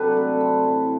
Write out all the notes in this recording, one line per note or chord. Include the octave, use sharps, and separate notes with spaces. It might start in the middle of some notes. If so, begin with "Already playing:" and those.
Already playing: C3 F#3 D4 A4 B4
A3
C4
E4